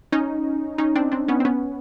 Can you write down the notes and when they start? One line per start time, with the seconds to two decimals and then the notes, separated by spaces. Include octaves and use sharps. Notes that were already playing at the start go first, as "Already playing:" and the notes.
0.12 C#4 D#4
0.78 C#4 D#4
0.96 C4 D4
1.12 C4 D4
1.28 B3 C#4
1.40 C4
1.45 B3 C#4